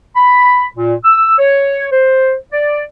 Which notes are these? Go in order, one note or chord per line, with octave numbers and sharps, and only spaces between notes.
B5
A#2
E6
C#5
C5
D5